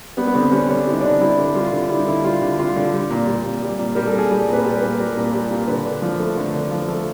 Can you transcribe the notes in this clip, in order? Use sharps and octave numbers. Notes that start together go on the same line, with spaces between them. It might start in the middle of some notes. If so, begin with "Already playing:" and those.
G3 B3
B3
D3 C4
G3 C#4
D3 D4
G3 E4
D#4
D4
D3 D#4
G3 E4
D3
G3 F4
D3
G3 E4
D#4
D3 E4
G3 F4
D3
G3 F4
D3
G3
A#2
G3
A#2
G3
A#2
G3 A#4
A4
A#2 G#4
G3 G4
A#2 B4
G3
B4
A#2
G3 A#4
A#2
G3
A#2
D3 B4
D3
F3
A3
D3
D3
F3
A3